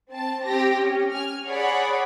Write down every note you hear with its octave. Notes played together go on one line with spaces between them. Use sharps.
C4 A5
C4 G4 A#6
C#4
G#5 F6
G#4 C#5 D5 F#5 B5